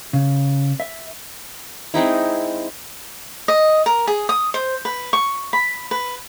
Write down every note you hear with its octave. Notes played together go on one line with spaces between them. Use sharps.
C#3
E5
G#3 C4 D#4 E4
D#5
A#4
G#4
D#6
C5
B4
C#6
B5
B4